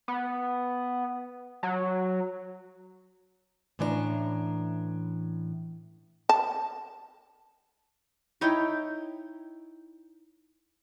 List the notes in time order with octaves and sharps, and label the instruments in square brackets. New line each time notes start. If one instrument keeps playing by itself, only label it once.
[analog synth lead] B3
F#3
[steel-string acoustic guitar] A2 E3 C#4 D4 C#5 A#5
[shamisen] A5
[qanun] D#4 E4 C#5 G5